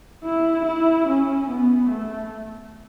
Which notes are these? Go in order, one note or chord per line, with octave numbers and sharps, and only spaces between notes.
E4
E4
C#4
B3
A3